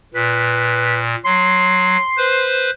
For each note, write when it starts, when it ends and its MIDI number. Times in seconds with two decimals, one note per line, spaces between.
0.14 1.16 46
0.14 0.99 71
1.25 1.97 54
1.25 2.55 84
2.17 2.70 71
2.17 2.70 72